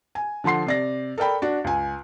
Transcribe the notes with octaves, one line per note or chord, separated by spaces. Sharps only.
G#5
D3 F3 F#5 C6 C7
C3 D5 A#6
A4 A#4 D5 G5 B5
D4 F#4
C#2 G#5